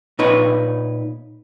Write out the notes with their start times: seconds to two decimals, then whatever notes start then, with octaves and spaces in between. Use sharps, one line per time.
0.19 A#2 D#4 B4 C#5